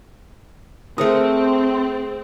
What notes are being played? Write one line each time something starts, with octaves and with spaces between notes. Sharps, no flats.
A3 C4 G#4 A#4 C5 D#6